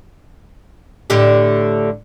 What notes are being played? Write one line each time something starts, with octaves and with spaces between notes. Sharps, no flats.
A2 D3 G4